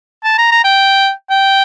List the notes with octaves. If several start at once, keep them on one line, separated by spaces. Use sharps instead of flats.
A5
A#5
A#5
G5
G5